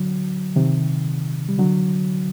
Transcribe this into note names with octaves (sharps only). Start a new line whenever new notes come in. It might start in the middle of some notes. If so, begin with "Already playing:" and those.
Already playing: D3 F#3
C3 D#3
G3
D3 F#3